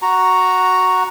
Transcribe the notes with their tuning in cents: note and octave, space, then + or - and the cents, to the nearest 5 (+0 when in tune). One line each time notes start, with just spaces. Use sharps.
F#4 +0 F#5 +0 A#5 +0